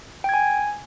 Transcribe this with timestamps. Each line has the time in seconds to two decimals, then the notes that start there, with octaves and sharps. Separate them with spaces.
0.24 G5
0.29 G#6
0.34 G#5